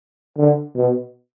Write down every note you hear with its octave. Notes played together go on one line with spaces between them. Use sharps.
D3
B2